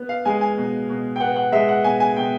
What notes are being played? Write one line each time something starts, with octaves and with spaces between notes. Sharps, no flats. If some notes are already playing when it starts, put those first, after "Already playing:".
Already playing: B3
F5
G#3 G#5
G#5
B2
B2
G5
B3 F#5
F#5
G#3 E5
F#5
B2 G#5
G#5
B2 G5